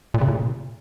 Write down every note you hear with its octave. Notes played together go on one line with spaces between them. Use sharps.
A#2
C#3
A#2